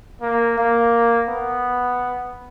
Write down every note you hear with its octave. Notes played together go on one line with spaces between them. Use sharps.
A#3
A#3
B3